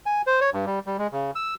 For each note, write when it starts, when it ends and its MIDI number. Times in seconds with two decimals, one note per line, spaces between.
0.06 0.22 80
0.27 0.40 72
0.41 0.50 73
0.53 0.65 43
0.66 0.79 55
0.87 0.97 55
0.98 1.07 56
1.12 1.31 49
1.35 1.54 88